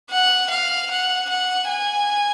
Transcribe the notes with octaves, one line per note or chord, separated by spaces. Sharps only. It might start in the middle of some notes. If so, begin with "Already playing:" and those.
F#5
F5
F#5
F#5
G#5